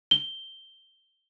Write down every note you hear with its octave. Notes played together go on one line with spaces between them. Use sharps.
G7